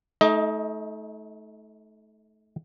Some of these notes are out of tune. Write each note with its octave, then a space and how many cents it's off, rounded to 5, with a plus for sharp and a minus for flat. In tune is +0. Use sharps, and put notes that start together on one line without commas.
A3 -25 D#4 +30 D#5 +15